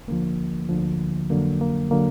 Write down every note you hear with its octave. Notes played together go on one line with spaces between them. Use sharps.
D2 D3 F3 A#3
D2 D3 F3
F2 D3 F#3 A#3
A#3
D3 F#3 A#3